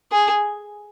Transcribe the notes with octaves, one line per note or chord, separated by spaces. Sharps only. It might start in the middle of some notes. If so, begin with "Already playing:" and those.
G#4